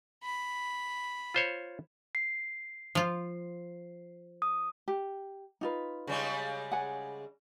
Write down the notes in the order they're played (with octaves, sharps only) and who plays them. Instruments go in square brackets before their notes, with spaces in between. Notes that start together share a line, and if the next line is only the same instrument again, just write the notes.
[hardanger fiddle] B5
[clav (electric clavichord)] F4 C5 C#5
[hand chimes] C7
[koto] F3 F4
[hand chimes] D#6
[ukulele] G4
D#4 F4 B4
[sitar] C#3 G3 G#3
[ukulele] F#5 G#5